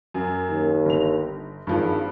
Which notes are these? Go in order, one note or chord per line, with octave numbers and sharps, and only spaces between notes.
F#2
D#2
G1 F7
G#1 G2 F3